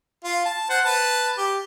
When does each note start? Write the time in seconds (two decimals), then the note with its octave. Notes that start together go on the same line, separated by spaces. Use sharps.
0.24 F4
0.45 A5
0.70 C5 F#5
0.85 B4 A5
1.38 G4